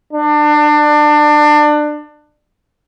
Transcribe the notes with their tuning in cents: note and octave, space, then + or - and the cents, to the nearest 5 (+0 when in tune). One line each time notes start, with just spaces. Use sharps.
D4 +25